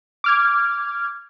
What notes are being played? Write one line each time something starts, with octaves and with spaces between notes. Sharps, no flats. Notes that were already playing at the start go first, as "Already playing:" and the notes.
D6 F6 G#6